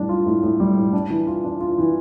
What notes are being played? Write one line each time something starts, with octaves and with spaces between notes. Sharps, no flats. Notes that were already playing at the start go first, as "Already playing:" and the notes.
Already playing: A2 G3 D4
F4
A2
A2
G3
A2
D4
E3
F4
D4
F4
E3